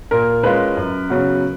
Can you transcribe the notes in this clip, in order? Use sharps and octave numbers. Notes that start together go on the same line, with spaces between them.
A#2 A#4
G#3 C#4 F4 B4
F#2
C#3 F#3 B3 F#4